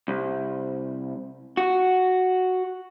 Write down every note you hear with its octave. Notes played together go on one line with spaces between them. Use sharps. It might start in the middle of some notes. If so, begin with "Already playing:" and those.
C2
F#4